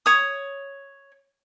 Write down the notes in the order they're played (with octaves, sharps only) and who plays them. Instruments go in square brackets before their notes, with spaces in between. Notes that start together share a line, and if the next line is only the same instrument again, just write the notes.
[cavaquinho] C#5 D#6